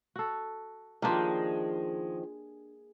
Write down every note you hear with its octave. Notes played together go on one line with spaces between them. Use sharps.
F#4 A4
D#3 F3 G#3 A#3 D4 G4